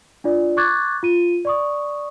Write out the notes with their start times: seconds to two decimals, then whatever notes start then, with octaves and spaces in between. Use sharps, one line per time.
0.24 D4 F4 D5
0.57 C#6 D6 F#6 G#6 A6
1.03 F4 D#7
1.45 D5 C#6 D#6